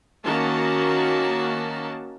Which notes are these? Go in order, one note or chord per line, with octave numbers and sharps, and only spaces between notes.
D#3 A#3 C#4 F#4 A5